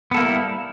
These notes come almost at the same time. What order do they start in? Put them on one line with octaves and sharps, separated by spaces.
B3 A4 A#3 E4 G3